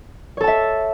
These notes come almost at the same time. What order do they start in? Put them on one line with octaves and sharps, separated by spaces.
C#5 A4 A5 E5